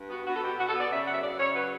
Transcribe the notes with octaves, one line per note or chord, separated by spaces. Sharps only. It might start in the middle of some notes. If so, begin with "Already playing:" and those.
Already playing: G2
B3 F#4
B3 F#4
A4
B2 G4
B2 F#4
A4
B3 D5
C#3 E5
F#2 F#5
E5
C#3 D5
C#3 C#5
F#3 B4